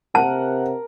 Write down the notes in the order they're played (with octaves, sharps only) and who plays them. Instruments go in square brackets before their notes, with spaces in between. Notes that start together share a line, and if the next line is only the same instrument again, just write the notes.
[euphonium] C3 [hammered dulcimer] A#4 [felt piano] F#5 [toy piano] A5